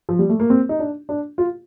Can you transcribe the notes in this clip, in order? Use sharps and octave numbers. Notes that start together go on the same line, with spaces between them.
F3
G3
A3
A#3
C4
D#4
D4
D4
F4